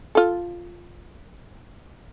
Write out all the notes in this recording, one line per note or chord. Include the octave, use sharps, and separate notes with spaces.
F4 A4